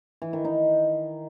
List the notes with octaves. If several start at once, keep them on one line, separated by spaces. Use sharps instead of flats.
E3
D#3
D#4